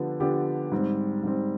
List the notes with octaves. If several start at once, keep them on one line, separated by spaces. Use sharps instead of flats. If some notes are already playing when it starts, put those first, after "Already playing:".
Already playing: D3 F3 B3 D4 G4
D3 F3 B3 D4 G4
G#2 G3 C4
G#2 G3 C4